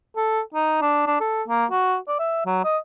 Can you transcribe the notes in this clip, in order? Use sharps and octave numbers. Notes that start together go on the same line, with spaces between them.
A4
D#4
D4
D4
A4
A#3
F#4
D5
E5
F#3
D#5